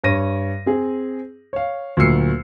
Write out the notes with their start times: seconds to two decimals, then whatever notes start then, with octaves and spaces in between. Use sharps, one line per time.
0.03 G2 C#5 A#6 D#7
0.66 C4 G#4
1.53 C#5 F5
1.97 D2 A#2 F#3 E6 C7 C#7